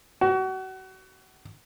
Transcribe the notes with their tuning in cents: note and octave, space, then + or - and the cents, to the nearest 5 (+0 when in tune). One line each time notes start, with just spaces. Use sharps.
F#4 +35